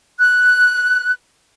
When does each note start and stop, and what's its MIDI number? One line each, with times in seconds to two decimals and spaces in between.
0.20 1.13 90